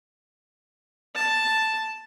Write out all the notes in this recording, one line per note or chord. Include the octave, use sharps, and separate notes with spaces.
A5